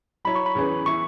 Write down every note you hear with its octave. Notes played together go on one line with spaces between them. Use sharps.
F#3 E4 C#5 B5
C#6
B5
E2 E3 C#4 G#4 B4
E3 B3 E4 C#6